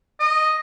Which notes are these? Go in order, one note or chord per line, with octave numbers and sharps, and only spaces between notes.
D#5